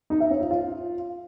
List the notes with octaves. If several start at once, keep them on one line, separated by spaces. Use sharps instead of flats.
D#4
E5
C#4
F4
F4